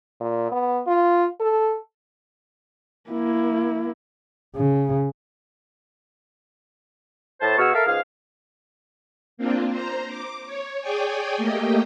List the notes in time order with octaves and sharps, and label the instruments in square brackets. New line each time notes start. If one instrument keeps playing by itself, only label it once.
[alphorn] A#2
B3
F4
A4
[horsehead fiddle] A#3 E4
[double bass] C#3
[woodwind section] A2 C5 A5
B2 F#4 G#4 C#6 E6 F6
A4 A#4 E5 F5
C#2 G#2 G#4 F5
[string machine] A#3 C4 D4 F4
C5 A#5
D6
C#5
G#4 C#5 D5 G5 G#5
A3 A#3 G4 D#5 G5